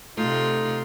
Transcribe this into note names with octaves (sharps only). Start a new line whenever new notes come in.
C3 A3 D#4 F4